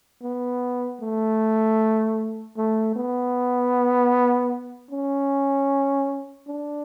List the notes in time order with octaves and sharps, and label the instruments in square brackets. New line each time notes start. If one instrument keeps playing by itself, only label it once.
[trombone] B3
A3
A3
B3
C#4
D4